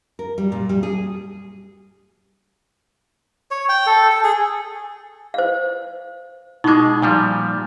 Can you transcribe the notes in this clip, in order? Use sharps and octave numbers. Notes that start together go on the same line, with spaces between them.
A#4
G3
A#2
G3
G#4
C#5
G5
A4
A4
G#4
C5 F5
B2 G#3 D#4 C#6 D6
A#2 F3 G3